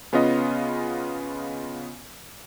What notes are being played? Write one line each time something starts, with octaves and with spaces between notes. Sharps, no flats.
C#3 B3 C#4 F4 D#5